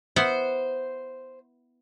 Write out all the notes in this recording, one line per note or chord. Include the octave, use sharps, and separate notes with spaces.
B3 E4 C5 F#5